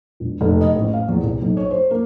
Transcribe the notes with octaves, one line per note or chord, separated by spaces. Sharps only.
E1
F1
D#5
A1
F5
E2
C2
B1
C#5
C5
A#3